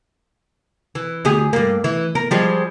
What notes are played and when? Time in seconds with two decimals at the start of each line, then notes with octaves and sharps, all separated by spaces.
0.95 E3
1.25 D2 G4 G#4
1.53 G2 A#3
1.84 E3
2.15 A#4
2.31 F3 G3 G#3